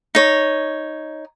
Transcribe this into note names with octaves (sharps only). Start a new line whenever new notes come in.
D#4 C#5